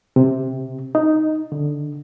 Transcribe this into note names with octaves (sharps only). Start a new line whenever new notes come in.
C3
D#4
D3